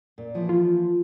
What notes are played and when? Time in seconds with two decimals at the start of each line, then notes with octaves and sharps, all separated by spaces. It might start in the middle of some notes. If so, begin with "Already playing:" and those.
0.18 A#2
0.34 E3 F3 A#3
0.49 F4